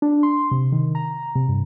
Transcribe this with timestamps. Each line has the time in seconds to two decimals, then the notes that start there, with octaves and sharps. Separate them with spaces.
0.02 D4
0.23 C6
0.51 C3
0.72 D#3
0.95 A#5
1.35 C3
1.49 G2